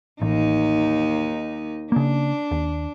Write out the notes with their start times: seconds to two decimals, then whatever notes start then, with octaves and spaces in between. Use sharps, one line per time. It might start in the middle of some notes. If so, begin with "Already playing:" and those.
0.21 A1 D#2 D#4
1.92 C#3 A#3 D4
2.51 D#2